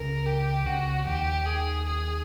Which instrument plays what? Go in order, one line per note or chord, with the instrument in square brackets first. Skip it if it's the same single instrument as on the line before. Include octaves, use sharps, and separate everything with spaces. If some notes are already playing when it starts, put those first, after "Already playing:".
Already playing: [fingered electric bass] C#2 C#3 [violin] A#4
[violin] G4
[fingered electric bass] C#2 C#3 [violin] F#4
[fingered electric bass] D#2 D#3 [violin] G4
[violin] G#4
G#4